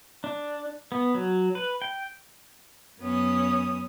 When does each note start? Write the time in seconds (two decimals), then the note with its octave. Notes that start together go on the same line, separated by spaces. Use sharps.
0.24 D4
0.92 B3
1.15 F#3
1.55 B4
1.82 G5
2.99 F#2 B3 C#4 D#6